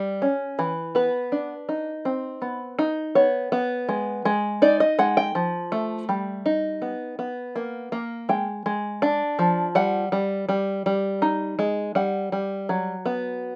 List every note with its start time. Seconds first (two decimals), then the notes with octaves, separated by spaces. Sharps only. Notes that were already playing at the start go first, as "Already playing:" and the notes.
Already playing: G3
0.22 C#4
0.59 E3
0.95 B3 B4
1.32 D4
1.69 D#4
2.05 C4
2.42 B3
2.79 D#4
3.15 B3 C#5
3.52 B3
3.89 G#3
4.25 G#3
4.62 D#4 D5
4.80 D#5
4.99 G#3 F#5
5.17 G5
5.35 F3
5.72 A3
6.09 G3
6.46 D#4
6.82 B3
7.19 B3
7.56 A#3
7.92 A#3
8.29 G#3 G5
8.66 G#3
9.02 D4
9.39 F3
9.75 G3 F#5
10.12 G3
10.49 G3
10.86 G3
11.22 D#4
11.59 G#3
11.95 G3 F#5
12.32 G3
12.69 F#3
13.06 B3